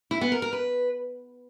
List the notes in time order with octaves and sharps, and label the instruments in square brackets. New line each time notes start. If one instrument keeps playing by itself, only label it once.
[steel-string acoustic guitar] E4
B3
A#4
A#4
B4